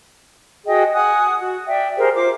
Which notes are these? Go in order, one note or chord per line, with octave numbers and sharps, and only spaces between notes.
F#4 G#4 D#5 G5
F#5 G#5 D#6 F#6
F#4
D5 E5 G5
G4 G#4 A#4 C5
F4 C5 D6